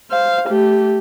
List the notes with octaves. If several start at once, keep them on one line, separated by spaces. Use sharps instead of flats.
C5 F5
A3 G4